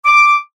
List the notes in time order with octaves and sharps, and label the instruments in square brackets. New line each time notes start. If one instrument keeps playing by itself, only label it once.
[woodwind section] D6